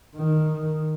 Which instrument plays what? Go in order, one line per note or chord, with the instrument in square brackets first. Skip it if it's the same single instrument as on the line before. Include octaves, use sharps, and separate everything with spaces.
[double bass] D#3